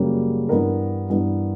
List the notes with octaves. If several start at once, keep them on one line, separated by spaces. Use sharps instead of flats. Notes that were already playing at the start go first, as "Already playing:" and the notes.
Already playing: F#2 C#3 G3 A#3
G2 E3 B3 A#4
G2 E3 B3